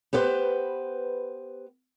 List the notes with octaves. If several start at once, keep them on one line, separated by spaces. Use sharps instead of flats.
B3 G4 B4 C5